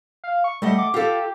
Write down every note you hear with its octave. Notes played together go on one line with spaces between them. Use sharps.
F5
C#6
G3 A3 D#5 F#5
D6
F4 G4 A4